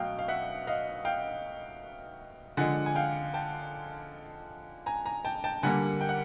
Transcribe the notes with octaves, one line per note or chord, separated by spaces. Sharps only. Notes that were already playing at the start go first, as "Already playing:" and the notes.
Already playing: B2 F#3 A3 D#5 F5 G5
F5
E5 F#5
D#5 F5
F5 G5
D3 F3 G#3 F#5 G#5
G#5
F5 G5
G5 A5
G#5 A#5
G#5 A#5
G5 A5
G5 A5
D3 G3 A#3 F#5 G#5
G5
F#5